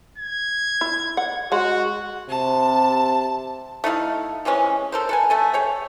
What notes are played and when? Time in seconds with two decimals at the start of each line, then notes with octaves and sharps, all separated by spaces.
0.18 G#6
0.81 E4
1.17 F#5
1.52 G#3 F#4 F#5
2.29 C3 A5
3.84 A3 D#4 E4 F5
4.45 C3 E3 G#3 C#4
4.92 A4 A#4 C5
5.09 A4 B4 G#5
5.30 A3 A4 G#5
5.53 G#4 C#5 G5